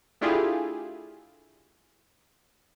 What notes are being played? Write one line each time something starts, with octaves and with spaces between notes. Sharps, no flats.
A3 D4 E4 F4 G4 G#4